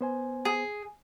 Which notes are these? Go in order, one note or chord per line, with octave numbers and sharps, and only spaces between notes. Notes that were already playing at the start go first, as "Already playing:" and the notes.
B3 C5 G#5
G#4